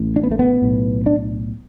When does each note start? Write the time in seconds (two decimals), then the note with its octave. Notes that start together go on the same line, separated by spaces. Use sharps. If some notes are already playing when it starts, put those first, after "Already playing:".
Already playing: A1 A2
0.16 D4
0.23 B3
0.31 A3
0.39 B3
0.62 B1 A2
1.06 D4